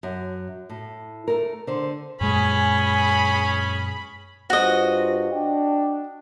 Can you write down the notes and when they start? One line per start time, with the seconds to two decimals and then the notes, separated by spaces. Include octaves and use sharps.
0.03 F#2
0.69 A2
1.28 A3 A#4
1.67 D3 C5
2.21 F#2 A#2 G#3 C#4 G#4 B5
4.50 G2 F4 F#4 C5 D#5
5.32 D4 G5